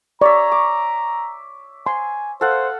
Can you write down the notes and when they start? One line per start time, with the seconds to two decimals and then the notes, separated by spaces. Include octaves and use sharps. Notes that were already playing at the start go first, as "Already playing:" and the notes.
0.21 C#5 D5 E5 A#5
0.52 D6
1.86 G#5 C6
2.41 A4 C5 F5 F#5